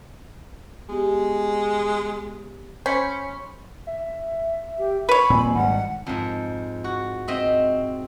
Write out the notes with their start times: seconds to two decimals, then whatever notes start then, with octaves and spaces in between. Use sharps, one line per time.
0.89 G#3 B3 G4
2.86 C#4 C5 B5 C#6
3.87 E5
4.79 G4
5.09 B4 C#5 B5
5.30 D#1 A#2 C4 G#5
5.55 G#1 G#2 G3 F#5
6.06 F2 G#2
6.84 F#4
7.28 C4 D#5 E5